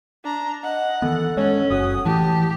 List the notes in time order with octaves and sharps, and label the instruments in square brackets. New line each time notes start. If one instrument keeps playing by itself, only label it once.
[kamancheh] D4 A#5
[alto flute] D#5 [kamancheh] F#5
[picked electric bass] D#3 E3 B3 [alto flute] A4
[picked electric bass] G2 G#3 [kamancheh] C#4 [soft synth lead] C#5
[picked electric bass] F#1 [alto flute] F#4 [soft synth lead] D#6
[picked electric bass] A2 [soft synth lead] E3 [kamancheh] G4 [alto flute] A5